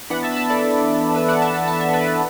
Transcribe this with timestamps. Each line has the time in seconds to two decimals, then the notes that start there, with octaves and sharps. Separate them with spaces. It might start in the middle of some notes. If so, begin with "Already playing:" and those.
0.10 E3 B3 D4 F#5 B5
0.23 E5 A5
0.32 B5
0.36 E5 A5
0.50 A4 D5
1.15 B4 E5
1.28 D5 F#5
1.41 E5 A5
1.54 E5 A5
1.67 E5 A5
1.80 E5 A5
1.93 B4 E5
2.01 D5
2.07 B4